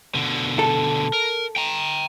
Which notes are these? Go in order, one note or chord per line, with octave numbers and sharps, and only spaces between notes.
B2 D3
A4
A#4
G5 A#5